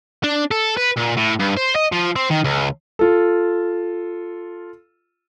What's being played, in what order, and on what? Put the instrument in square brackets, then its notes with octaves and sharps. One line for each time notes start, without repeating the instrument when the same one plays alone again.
[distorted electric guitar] D4
A4
B4
A#2
A2
G2
C5
D#5
F3
C4
D#3
C#2
[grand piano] F4 A4